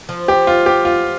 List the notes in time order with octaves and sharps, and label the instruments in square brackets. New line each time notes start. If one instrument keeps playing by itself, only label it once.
[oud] F3
[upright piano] G4
F4
G4
F4